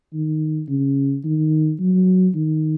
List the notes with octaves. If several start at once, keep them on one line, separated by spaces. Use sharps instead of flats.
D#3
C#3
D#3
F#3
D#3